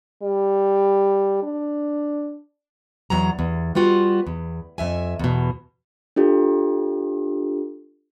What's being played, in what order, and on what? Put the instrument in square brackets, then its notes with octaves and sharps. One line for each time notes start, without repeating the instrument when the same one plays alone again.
[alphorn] G3
D4
[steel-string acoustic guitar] E2 F#3 A#5
E2
G3 B3 F4 F#4
E2
F2 E5 G#5
E2 B2
[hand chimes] D4 F4 G4 A4